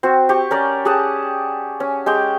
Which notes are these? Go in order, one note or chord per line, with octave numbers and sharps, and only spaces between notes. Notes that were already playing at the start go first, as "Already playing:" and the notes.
C4 F#4
G4 C#6
C#4 A#4 D5
G4 G#4 F#5 A5
C#4
G#3 G4 G5